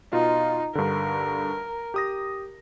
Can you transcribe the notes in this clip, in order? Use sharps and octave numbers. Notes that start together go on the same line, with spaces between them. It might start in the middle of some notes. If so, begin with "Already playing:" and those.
B2 D#4 F4
G2 D3 A#4
G4 D#6 A#6